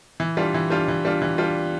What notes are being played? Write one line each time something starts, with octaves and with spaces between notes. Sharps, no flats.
E3
G3 D4 F4
E3
G3 D4 F4
E3
G3 D4 F4
E3
G3 D4 F4